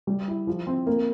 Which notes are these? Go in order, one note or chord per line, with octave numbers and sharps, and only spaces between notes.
G3
E4
F3
C4
A#3